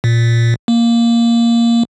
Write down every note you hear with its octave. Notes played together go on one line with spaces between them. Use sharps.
A#2
A#3